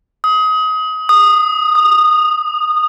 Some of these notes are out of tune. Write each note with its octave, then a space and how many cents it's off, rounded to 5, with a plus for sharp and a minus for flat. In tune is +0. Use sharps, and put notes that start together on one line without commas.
D#6 +25
D#6 -15
D#6 -35